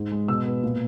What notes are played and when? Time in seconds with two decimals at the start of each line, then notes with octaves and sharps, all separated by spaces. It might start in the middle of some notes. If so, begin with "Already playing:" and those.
Already playing: G#2
0.12 G#3
0.28 B2 E6
0.46 B3
0.63 A#2